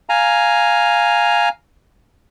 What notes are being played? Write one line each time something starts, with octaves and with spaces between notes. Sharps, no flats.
F5 G#5 A#5